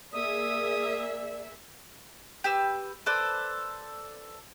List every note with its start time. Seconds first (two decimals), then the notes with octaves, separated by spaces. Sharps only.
0.13 A#3 G#4 D5 E5 D#6
2.44 G4 B4 E6
3.06 A4 B4 C5 D5